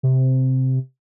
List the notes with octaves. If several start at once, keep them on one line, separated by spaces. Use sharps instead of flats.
C3